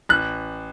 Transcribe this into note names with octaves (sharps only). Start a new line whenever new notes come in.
A1 F#6